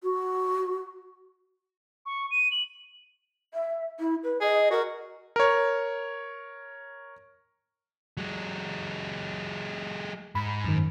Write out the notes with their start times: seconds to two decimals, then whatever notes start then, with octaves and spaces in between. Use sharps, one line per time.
0.03 F#4
2.06 C#6
2.31 D#7
2.51 F#7
3.53 E5
3.99 E4
4.23 B4
4.41 G#4 D#5
4.71 F#4 A#4
5.36 A#4 C#5
8.17 F#3 G#3
10.35 G#2 B5
10.64 F#2 D#3